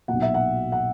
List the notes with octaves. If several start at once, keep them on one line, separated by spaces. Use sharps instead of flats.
B1 A#2 F#5
E5
F#5
F#5